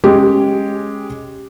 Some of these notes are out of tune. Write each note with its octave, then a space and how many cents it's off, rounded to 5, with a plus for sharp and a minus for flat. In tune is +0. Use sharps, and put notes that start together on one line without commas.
G#3 +0 C#4 -10 G4 +0